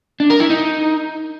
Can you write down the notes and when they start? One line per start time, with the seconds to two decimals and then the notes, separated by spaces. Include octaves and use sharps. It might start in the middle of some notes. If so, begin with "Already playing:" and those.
0.20 D4
0.30 A#4
0.40 E4
0.50 D#4